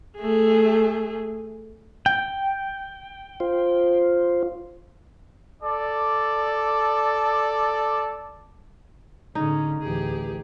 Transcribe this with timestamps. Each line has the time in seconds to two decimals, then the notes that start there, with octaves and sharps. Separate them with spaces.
0.18 A3 G#4
2.06 G5
3.40 F4 C5
5.63 A4 D5
9.35 A2 D3 C#4 D#4 G#4
9.80 A1 D2 E3 G4 G#4